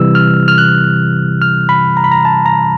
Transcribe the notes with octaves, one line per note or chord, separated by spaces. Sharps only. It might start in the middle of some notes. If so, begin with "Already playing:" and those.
Already playing: C3 E3 G3 E6
F6
F6
F#6
F6
B5
A#5
B5
A#5
A5
A#5